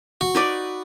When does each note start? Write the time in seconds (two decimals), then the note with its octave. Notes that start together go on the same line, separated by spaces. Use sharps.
0.21 F#4
0.35 D#4 B4 D5